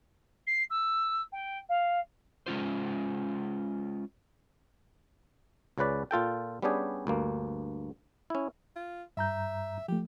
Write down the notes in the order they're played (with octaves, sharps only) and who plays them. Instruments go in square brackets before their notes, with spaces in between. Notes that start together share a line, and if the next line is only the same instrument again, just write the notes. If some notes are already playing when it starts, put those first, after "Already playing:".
[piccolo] C7
E6
G5
F5
[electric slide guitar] G#3 C#4 F4 C5
[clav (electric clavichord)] C#2 C#3 C#4 B4 D5
A#2 F4 A4 G5
G3 B3 C#4 D4 G4 G#4
D2 G2 A#3
C#4 E4
[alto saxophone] F4
[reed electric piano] G2 A#5 G6 [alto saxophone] E5
[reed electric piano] F3 A3 [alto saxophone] G4